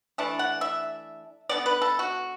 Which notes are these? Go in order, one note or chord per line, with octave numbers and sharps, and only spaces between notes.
E3 A3 D4 A5
F#5
E5
D3 B3 D4 D5
B4
A4
F#4